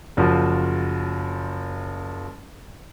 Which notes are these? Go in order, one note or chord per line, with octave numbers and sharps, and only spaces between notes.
F#1 F3 F4 F#4